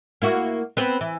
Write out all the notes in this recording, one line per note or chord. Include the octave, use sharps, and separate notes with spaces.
A#3 E4 F#4
B3 C4 B4
E3